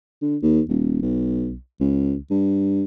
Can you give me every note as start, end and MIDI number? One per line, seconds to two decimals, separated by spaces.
0.22 0.36 50
0.42 0.61 39
0.69 0.98 27
1.02 1.56 35
1.80 2.16 37
2.30 2.84 43